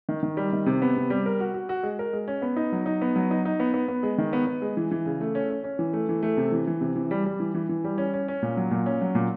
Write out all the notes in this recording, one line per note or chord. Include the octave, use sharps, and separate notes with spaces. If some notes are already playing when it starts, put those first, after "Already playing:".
D#3
D#3
G3
D#3
C3
B3
C3
G3
A#4
F#4
F#4
F#4
G#3
A#4
G#3
C#4
B3
D#4
F#3
D#4
B3
F#3
D#4
D#4
B3
B3
B3
G#3
D#3
B3
B3
G#3
E3
E3
C#3
A3
C#4
C#4
C#4
E3
A3
E3
A3
C3
E3
E3
C3
E3
G3
G3
E3
E3
E3
G3
C#4
C#4
C#4
A#2
F#3
A#2
C#4
F#3
A#2